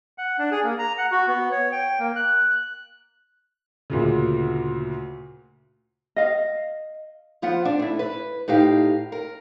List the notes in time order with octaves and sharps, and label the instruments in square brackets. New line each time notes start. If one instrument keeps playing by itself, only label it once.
[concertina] F#5
D4
G#4
A#3
A#5
F#5
F#4
B3
C#5
G5
A#3
F#6
[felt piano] D2 A#2 C#3
[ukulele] D#5 F5
[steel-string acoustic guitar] F3 B3 F4 C5 F#5
D4
A3 E4
B4
A2 D#4 G4 F5
A#4